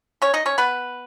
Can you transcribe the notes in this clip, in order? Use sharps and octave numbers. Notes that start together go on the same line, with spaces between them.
C#4 C#5
D#4 D#5
C#4 C#5
B3 B4